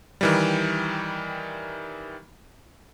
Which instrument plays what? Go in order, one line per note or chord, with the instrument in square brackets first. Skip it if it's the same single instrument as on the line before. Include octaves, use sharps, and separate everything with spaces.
[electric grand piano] D#3 E3 G3